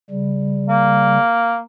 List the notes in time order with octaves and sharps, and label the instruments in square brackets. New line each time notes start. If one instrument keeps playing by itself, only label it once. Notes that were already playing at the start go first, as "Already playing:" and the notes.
[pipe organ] C#3 G3
[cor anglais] A#3